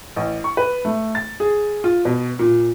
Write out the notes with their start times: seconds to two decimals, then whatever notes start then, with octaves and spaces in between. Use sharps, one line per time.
0.16 A1
0.44 C#6
0.57 B4
0.85 A3
1.15 A6
1.40 G#4
1.84 F4
2.05 B2
2.39 A#2